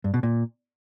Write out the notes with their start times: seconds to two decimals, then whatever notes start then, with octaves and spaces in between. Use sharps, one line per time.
0.04 G2
0.14 B2
0.23 A#2